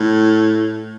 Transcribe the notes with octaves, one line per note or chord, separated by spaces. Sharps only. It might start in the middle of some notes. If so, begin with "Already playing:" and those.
Already playing: A2